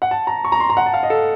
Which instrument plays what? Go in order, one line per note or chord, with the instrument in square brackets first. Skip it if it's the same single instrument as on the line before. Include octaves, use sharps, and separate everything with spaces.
[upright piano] F#5
A5
A#5
C#6
A#5
C6
A#5
F#5
A5
F5
D#5
A4